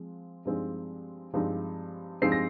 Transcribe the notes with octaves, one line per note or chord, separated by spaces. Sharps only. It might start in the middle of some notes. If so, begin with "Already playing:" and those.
Already playing: F3 G#3 C4
G2 F3 G#3 C4 D#4
G2 F3 G#3 C4 D#4
G2 F3 G#3 C4 D#4 C7
A#6